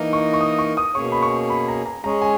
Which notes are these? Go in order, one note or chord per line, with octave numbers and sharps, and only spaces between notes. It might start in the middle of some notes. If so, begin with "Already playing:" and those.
Already playing: E3 A#3 D#4 A#4 D#5
C#6
C#6
D#6
C#6
D#6
B2 A#3 C#4 G#4 C#5 C#6
B5
C#6
B5
A#5
A#5
G#3 C#4 G#4 C#5 A#5
G#5